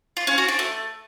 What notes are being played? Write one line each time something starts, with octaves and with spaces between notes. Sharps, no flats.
F4
C#4
F#4
D4
A3